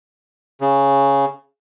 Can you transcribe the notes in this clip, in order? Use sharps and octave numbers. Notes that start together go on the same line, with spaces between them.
C#3